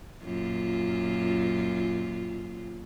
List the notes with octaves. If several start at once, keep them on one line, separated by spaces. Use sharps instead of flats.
F#2 A#2 F4